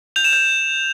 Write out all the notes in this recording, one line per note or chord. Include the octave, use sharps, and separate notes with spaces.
G6 F7
E7
G6